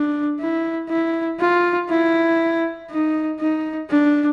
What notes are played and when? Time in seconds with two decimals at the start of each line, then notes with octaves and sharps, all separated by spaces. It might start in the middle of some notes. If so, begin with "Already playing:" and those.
Already playing: D4
0.40 E4
0.90 E4
1.40 F4
1.90 E4
2.91 D#4
3.40 D#4
3.91 D4